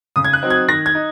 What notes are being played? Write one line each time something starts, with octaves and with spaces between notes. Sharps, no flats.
C#3 D#6
G#6
F#6
F#3 C4 D#4
G#6
D#3 A#6
G#6
D#4